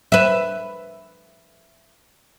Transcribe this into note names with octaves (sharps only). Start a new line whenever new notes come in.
B4 E5